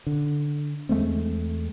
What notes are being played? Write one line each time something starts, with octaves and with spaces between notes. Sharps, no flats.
D3
E2 G#3 A3 C4